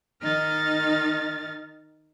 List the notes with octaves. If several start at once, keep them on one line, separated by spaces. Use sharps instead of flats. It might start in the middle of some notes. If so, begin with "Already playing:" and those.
D#3 D#4 F6 A6